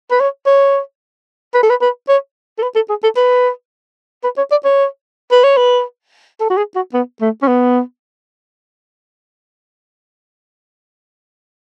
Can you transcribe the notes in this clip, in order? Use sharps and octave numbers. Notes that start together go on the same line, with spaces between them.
B4
C#5
C#5
B4
A4
B4
B4
C#5
A4
B4
A4
G#4
A4
B4
B4
C#5
D5
C#5
B4
C#5
B4
A4
F#4
G#4
F#4
B3
A3
C#4
B3